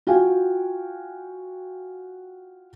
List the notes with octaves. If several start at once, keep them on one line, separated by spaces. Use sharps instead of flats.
F4 F#4 F5 G5 G#5